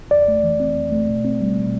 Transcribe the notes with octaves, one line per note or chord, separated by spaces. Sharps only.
F2 D5
A3
E3
C4
F2
A3
B2
C4
G3
B2